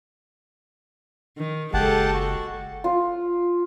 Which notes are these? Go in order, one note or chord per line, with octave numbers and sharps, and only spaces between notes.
D#3
F#1 G#3 G4 A4 F#5 A5
F#4
F4